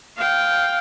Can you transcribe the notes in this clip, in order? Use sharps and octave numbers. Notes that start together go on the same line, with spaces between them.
F5 G5